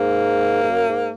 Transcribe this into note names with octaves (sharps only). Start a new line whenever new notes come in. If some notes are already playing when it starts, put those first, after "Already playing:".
Already playing: G#2 A#3
G#2
F#2
G#2